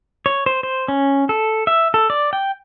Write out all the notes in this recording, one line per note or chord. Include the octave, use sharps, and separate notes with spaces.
C#5
C5
C5
C#4
A4
E5
A4
D5
G5